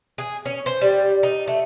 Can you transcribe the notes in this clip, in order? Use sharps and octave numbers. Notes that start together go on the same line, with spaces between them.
G#4
C#4
C5
G3
D#4
A3